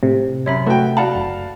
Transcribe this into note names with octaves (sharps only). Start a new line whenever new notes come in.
A2 C3
F#2 C#5 E5 B5
A3 F#4 B4 G5
F#4 D5 F5 F#5 A5 B5
F#1